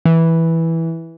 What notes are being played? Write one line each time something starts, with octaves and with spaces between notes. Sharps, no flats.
E3